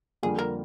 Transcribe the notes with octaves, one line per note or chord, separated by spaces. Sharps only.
F2 D3 G3 A#3 G#4
A#4